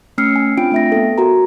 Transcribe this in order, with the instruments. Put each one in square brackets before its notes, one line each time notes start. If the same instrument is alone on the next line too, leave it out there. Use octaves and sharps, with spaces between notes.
[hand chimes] A3 C#4 E6 F6 C7 C#7
G#5
C4 D4 F4 G5 D7
A3 E5 A#6
B3 A4
F#4 A#4 A#5